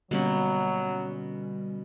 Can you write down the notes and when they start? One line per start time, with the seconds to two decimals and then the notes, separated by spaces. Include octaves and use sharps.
0.11 B2 D3 F#3 G3 A#3 C#4 B5